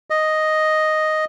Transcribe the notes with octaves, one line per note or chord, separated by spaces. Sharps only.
D#5